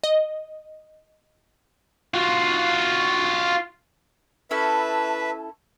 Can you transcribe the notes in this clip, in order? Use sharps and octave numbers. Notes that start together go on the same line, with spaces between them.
D#5
F4 F#4
C#4 E4 A4 B4 E5 A5